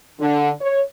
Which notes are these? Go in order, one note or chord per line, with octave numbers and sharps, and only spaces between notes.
D3
C#5